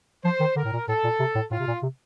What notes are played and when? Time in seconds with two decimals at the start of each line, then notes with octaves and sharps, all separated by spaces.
0.24 F3 C5
0.40 D#3
0.56 D3 A#4
0.64 A2
0.73 A#2
0.88 A2 A4
1.04 A#2
1.20 C3
1.35 A2
1.51 A2 F4
1.59 C3
1.67 A#2
1.82 C3